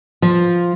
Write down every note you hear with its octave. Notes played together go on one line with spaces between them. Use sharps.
F3